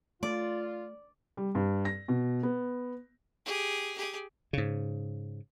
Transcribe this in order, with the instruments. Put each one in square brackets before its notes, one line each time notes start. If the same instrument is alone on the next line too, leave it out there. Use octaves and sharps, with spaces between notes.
[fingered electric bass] A3 [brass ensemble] F4 [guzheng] D5
[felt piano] G3
G2
A#6
B2
B3
[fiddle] G4 G#4
G4 G#4
[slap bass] G#2 C#3